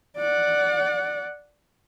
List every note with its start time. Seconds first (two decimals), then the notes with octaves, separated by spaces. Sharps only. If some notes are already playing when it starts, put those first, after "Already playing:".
0.17 D5 F#5